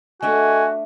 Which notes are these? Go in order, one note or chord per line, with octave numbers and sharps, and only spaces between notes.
A3 D4 F#4 A4 D#5 E5 G#5